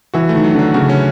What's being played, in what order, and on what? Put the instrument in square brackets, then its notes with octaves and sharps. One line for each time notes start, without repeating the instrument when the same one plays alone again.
[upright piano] E3 [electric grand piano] F#4
[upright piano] D#3 [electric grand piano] A3
[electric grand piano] F#3
[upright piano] D3 [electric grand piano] F#3
[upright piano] C#3 [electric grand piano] F#4
[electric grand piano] C#4